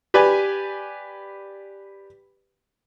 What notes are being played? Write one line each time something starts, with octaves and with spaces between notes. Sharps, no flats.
G4 B4 D5 G#5